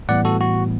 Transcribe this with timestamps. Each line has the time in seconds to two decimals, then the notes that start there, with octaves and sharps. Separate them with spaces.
0.09 A2 E3 G3 B3 D5 F#5
0.25 F#4 A4
0.41 F#4